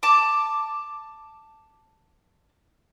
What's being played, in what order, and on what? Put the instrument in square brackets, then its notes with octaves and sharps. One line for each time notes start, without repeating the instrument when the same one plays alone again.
[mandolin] A5 D6